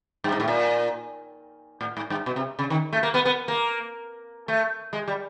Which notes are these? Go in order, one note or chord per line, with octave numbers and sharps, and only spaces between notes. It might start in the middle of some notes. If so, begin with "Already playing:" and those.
G2
G#2
A2
A#2
A2
G#2
G2
B2
C3
C#3
D#3
A3
A#3
B3
B3
A#3
A3
G#3
G3